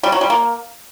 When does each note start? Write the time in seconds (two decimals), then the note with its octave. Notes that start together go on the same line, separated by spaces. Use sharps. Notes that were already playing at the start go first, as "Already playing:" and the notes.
0.03 G3
0.12 F#3
0.21 G3
0.30 A#3